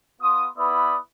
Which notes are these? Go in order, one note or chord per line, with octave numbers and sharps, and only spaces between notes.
B3 F4 C6 D#6
B3 E4 B4 D5 B5 D#6